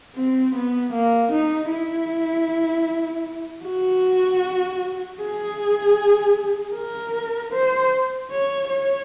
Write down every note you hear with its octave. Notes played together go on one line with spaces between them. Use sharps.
C4
B3
A#3
D#4
E4
F#4
G#4
A#4
C5
C#5
C#5